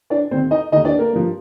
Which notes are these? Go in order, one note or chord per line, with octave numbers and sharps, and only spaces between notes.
D4 D5
D#2 D#3 C4 C5
D#4 D#5
D#2 D#3 D#4 D#5
D4 D5
A#3 A#4
G2 F3